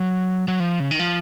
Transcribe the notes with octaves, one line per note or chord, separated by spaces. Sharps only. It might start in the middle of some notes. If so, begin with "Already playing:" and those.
Already playing: F#3
F#3
F3
C#3
D#3
F3